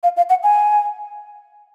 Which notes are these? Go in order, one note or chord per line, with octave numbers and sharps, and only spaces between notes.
F5
F5
F#5
G#5